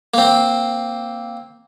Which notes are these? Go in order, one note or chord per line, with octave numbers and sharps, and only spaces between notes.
A#3 C4